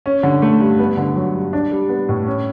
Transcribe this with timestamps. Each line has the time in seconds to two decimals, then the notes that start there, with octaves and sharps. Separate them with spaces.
0.06 C#4
0.23 D3
0.42 A3
0.60 G2
0.79 B3
0.97 D3
1.16 F#3
1.35 G2
1.53 D4
1.72 G3
1.89 B3
2.09 A2
2.27 C#4